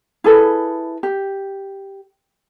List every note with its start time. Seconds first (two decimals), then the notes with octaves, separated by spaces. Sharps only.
0.24 E4 G#4 A4 B4
1.03 G4